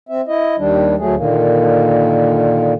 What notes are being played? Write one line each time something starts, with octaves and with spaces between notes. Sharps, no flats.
C4 E5
E4 D#5
D#2 D#3 G3 D4
D2 F#3 A3 G#4
A#2 D3 D#3 A#3